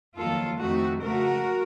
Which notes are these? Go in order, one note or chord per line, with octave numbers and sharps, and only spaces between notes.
F2 D#3 F#3 A#3 F4 A4
F2 D#3 A3 C4 D#4 F#4
C#3 F3 A3 F#4 A#4